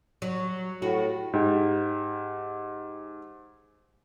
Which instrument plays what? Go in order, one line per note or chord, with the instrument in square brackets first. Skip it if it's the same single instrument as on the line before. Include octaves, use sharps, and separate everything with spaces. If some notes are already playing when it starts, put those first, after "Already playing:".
[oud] F#3
[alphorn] A2 [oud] F#4
[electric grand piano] G#2 G4